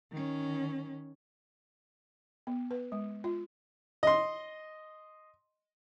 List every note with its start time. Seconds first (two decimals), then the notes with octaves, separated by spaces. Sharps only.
0.12 D#3 C#4
2.47 B3
2.71 B4
2.92 G#3
3.24 F4
4.03 D#5 C6